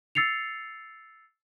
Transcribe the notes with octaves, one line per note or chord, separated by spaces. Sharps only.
E6 A6 C7 C#7 F7